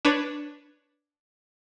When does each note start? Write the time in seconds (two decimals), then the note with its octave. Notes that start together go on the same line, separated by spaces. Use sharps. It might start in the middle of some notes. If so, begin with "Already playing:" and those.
0.05 D4 B4 C#5